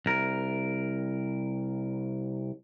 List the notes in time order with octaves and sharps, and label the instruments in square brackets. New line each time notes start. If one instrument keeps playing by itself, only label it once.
[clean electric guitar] C2 A#4